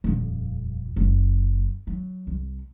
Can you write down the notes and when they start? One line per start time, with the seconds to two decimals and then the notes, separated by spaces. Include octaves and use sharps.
0.04 D#1 F2
0.96 F#1
1.87 F#3
2.27 C2